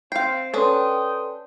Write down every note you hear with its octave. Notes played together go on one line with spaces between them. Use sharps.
C4 F5 G5 C7
C#4 D4 A4 B4 G5 C6 D#6